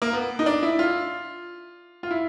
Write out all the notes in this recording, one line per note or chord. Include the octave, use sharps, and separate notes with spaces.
A#3
B3
D#4
D4
E4
F4
F4
E4